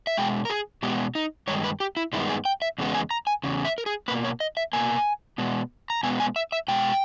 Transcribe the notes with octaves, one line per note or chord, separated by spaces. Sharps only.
E5
B2 G#3 G5
A#4
G#4
B2 G#3 B3 G4
D#4
G2 D#3 G#3 C#5
B4
G4
E4
G2 D#3 G#3 B3 E4
G#4
G5
E5
E2 C#3 G#3 B3
G#5
A#5
G#5
E2 C#3
E5
A#4
G#4
B2 A#3 B4
C#5
D#5
E5
B2 A#3 G#5
B2 G#3 B3
A#5
B2 G#3 B3 G#5
G#5
E5
E5
B2 G#3 G5